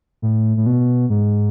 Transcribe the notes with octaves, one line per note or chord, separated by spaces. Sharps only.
A2
A2
B2
G#2